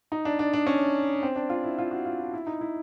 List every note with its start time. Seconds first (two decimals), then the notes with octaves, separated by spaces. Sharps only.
0.12 D#4
0.25 D4
0.39 D4
0.54 D4
0.67 C#4
1.23 C4
1.36 D4
1.50 F4
1.64 E4
1.78 F4
1.91 F#4
2.06 F4
2.19 E4
2.33 E4
2.47 D#4
2.61 E4